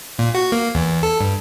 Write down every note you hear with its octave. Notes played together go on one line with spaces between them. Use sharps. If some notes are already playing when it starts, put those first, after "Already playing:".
A#2
F#4
A#3
E2
A4
G2